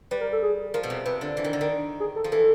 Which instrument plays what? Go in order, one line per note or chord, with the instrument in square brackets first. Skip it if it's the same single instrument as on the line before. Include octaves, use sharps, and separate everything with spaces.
[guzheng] G3 [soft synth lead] B4
[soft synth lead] A#4
A4
G#4
[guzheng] F3 [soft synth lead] A#4
[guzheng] B2
C3
[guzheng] C3 [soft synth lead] B4
[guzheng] D3
E3
D#3
D3
D#3
[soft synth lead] G#4
A4
[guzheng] F3
[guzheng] E3 [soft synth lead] A4